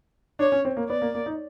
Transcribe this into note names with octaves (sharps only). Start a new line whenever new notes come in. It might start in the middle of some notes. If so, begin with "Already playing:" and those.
D4 C#5
C#4
C4
A#3
B3 D5
A#3
A#3
D#4